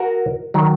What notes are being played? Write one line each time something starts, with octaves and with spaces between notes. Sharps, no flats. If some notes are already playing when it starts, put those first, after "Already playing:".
Already playing: F#4 A#4
D#3 F#3